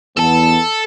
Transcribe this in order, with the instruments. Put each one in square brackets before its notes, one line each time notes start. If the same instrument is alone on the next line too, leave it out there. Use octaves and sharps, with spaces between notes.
[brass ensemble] E2 B3 [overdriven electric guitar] A4 A5